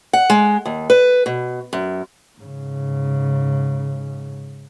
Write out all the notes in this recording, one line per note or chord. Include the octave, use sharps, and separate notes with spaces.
F#5
G#3
D#2
B4
B2
F#2
G#2 C#3